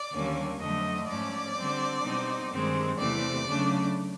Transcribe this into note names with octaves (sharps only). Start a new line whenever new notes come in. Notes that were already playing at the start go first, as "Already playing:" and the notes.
Already playing: D5
D#2 D3 G3 A#3 C#4
F2 D3 F#3 A3 D#5
G#2 F3 A3 C#4 D5
D3 G3 C4
B2 G3 C4 D#4
G2 D#3 G#3 C4
E2 C3 E3 A3 C4 D5
C#3 F#3 A3 D4